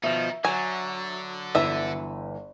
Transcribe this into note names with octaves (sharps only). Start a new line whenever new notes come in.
B2 D#3 F3 D#4 E5
D3 F#3 G#5
G1 E3 E5